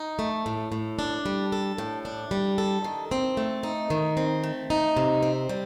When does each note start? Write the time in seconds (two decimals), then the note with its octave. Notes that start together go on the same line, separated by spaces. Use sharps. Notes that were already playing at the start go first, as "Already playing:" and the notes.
Already playing: D#4
0.19 A3
0.46 A2
0.72 A2
0.99 D4
1.26 G3
1.52 A4
1.78 A2
2.05 D4
2.31 G3
2.58 A4
2.84 D#3
3.11 C4
3.37 A3
3.63 D#4
3.90 D#3
4.17 C4
4.43 A3
4.70 D#4
4.97 C3
5.23 C4
5.49 G3